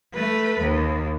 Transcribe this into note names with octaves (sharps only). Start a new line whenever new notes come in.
A3 B4
D#2